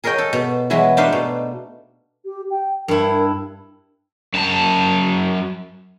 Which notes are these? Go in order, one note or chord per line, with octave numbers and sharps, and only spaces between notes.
G#4 A#4 C#5 D#5 G5
A4
B2
E3 F#3 G#3 E4 F#4 B4
A3 D4 D#4 B4 C5 F5
B2
G4
G5
G2 E4 A#4
F#2 A5